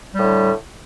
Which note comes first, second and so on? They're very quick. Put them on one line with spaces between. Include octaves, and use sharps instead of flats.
G3 A2 D3